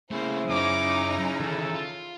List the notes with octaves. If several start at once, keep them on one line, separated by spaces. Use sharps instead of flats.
C#3 A3 A#3 E4 C5
F#2 C#4 D#4 A#5 D6
D#3 E3 A4
F4